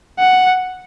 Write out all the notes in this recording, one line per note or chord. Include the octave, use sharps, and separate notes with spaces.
F#5